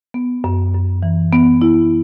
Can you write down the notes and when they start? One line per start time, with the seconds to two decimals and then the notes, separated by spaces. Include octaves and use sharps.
0.14 B3
0.44 F#2
0.74 F#2
1.03 E3
1.33 B3
1.61 E4